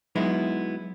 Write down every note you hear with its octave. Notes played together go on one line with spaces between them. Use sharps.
F#3 G#3 B3 D#4 E4